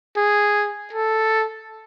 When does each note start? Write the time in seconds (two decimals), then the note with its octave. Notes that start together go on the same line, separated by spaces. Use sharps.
0.17 G#4
0.93 A4